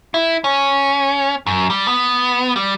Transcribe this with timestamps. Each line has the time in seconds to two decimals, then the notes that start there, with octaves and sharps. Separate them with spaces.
0.14 E4
0.44 C#4
1.46 F#2
1.70 G3
1.87 B3
2.56 G3